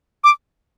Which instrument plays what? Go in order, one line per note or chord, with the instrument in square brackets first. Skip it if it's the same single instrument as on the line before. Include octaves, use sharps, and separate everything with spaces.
[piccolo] D6